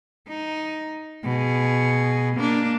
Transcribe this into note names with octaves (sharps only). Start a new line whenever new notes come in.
D#4
B2 G#4
A#3 D4